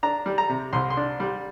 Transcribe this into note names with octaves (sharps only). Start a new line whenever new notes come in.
D4 A#5
G3
A#5
C3
C2 C6
C6
D4
G3